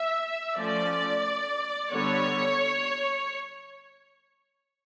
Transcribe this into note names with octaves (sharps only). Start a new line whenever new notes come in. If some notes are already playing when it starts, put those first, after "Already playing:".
Already playing: E5
F3 A3 C#4 D5
D3 G3 B3 C#5